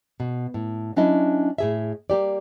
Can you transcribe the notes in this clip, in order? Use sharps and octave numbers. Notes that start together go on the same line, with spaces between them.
B2
A2
F#3 C#4 D4 E4 D#5
A2 G#4 E5
G3 A#3 G4 D5